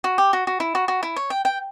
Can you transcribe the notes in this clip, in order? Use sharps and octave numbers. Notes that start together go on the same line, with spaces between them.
F#4
G4
F#4
F#4
E4
F#4
F#4
E4
C#5
G5
G5